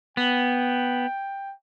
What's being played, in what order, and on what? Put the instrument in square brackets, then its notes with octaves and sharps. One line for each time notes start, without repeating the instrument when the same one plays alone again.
[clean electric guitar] B3 [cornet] G5